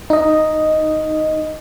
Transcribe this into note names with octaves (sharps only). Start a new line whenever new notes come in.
D#4 D#5